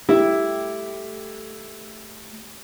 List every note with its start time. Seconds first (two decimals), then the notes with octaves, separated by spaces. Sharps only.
0.09 A3 E4 G4